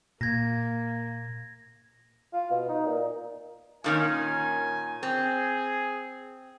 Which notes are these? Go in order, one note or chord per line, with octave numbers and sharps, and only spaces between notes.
A#2 A#3 G#6 A#6
F4
B2
D#4
A#2
A#2 D#3 C#4 G#5
C4 G#4